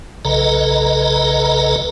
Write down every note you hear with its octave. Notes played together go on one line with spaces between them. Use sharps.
B1 C#3 A4 B4 D#5 A#5